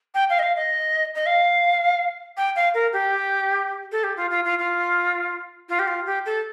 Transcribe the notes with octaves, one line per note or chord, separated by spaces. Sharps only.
G5
F5
D#5
F5
D#5
D#5
F5
G5
F5
A#4
G4
A4
G4
F4
F4
F4
F4
F4
G4
F4
G4
A4